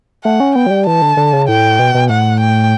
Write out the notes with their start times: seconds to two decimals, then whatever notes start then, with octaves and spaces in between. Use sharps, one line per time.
0.24 A3 F#5
0.40 C#4
0.55 B3 G5
0.66 F#3
0.70 G3
0.86 E3 A5
1.02 D3
1.17 D3
1.33 C#3
1.48 A2 G5
1.79 B2
1.95 B2
2.09 A2 F#5
2.40 G5